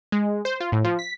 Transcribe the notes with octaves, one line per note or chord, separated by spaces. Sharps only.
G#3
C5
F4
A2
F3
B6